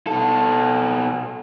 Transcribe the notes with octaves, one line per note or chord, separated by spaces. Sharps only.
B2 A4